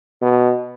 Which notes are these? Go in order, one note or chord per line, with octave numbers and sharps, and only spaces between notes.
B2